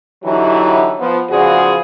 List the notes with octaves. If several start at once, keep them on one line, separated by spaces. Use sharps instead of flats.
D3 E3 F#3 D#4 E4 G4
F3 B3
E2 C#3 F3 F#4 G#4 D5